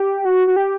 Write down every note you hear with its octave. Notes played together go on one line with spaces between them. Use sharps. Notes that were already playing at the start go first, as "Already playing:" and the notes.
Already playing: G4
F#4
F#4
G4